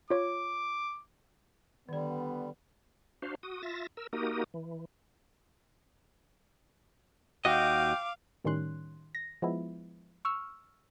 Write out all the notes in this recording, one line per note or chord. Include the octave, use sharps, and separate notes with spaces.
F4 C#5 D6
D3 D#3 G3 B3 D5
D4 F#4 C5 F5
F#4 D#6
F4 E5 A6 A#6
A#4 E6
A#3 D#4 F#4 G4 A#4 D#6
E3
D#2 F#4 D#5 F5 G5 D6
A2 D#3 G3 C#4 C6 F#6
A#6
F3 G#3 B3 E4
C#6 E6 F6